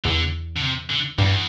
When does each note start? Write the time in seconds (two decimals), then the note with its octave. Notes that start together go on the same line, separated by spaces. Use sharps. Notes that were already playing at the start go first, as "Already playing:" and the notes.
0.04 E2 D3
0.56 D3
0.62 C3
0.90 D3
1.18 E2 G2